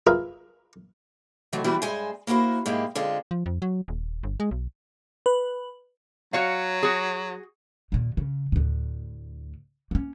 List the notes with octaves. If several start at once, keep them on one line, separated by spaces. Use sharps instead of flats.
F4 G#4 A#4 B4 E5 F5
C3 D#3 E3 F#3 A3
E3 G3 B3 C4 E4 F#4
G2 G#3 C5 E5 G#5
A#3 E4 F#4 A#4 C5
G#2 G#3 A#3 E4 G4
D3 G#3 C4 F4
F3
F2
F#3
D#1
G1
G#3
B1
B4
F#3 F#4 C#5 F5
F#4 G#4
D#2 A#2
C#3
D2 A2
A#3 C#4